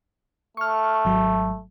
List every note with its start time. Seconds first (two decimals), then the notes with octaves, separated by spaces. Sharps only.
0.57 A3 C#6 F6
1.05 G#1 F#3